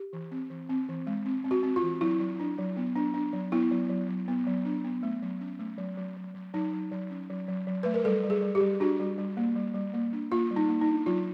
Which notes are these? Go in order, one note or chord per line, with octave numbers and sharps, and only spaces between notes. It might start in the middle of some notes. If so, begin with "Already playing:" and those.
Already playing: G4
E3
C4
E3
C4
E3
G#3
C4
C4
F#4
C4
F4
E3
F#3 E4
F#3
D4
F#3
B3
D4
D4
F#3
B3 E4
F#3
F#3
F#3
B3
F#3
D4
B3
A3
F#3
C#4
A3
F#3
F#3
F#3
F#3
F#3 D#4
F#3
F#3
C#4
F#3
F#3
F#3
A3 B4
A#4
G3 A4
G3
G#4
G3
G4
G3
D4 F#4
G3
G3
A#3
G3
G3
A#3
D4
A#3 F4
G3
D#4
A#3
D#4
D4
F#3 F4